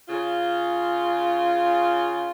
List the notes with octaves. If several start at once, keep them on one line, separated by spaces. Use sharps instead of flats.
C#3 F4